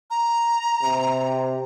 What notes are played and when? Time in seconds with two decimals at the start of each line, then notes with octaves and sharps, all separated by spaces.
0.10 A#5
0.83 C3